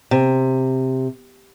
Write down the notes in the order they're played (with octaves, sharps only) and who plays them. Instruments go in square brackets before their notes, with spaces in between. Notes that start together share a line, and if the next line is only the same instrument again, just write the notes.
[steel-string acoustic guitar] C3